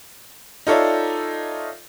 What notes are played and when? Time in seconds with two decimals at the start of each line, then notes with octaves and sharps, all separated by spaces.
0.67 D#4 F4 A4 C#5 D5 E5